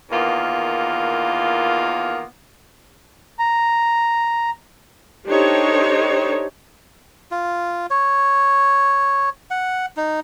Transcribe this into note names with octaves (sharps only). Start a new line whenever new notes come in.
E2 D#3 A#3 B3 F4
A#5
D4 D#4 G4 A4 C5 C#5
F4
C#5
F#5
D#4